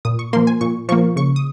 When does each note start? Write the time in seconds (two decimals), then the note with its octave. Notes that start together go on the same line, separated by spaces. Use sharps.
0.05 A#2 D#6
0.19 C#6
0.33 A#3 C6
0.36 F3
0.47 G#5
0.61 A#2 C#6
0.89 F3 C#6
0.92 A#3
1.16 C#3 C#6
1.36 D#6